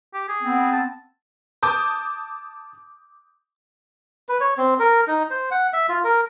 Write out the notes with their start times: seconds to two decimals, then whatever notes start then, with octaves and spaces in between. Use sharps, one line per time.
0.14 G4
0.29 G#4
0.42 B3 C4
0.73 A5
1.63 A5 D6 D#6 G6
4.29 B4
4.40 C#5
4.58 C4
4.79 A#4
5.08 D#4
5.31 C5
5.51 F#5
5.73 E5
5.89 F4
6.04 A#4